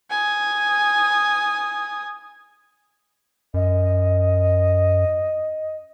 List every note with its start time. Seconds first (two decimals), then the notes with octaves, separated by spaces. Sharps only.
0.10 G#5 D#6
3.54 F#2 D#5